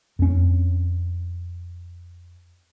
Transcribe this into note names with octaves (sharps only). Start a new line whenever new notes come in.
F2 C#4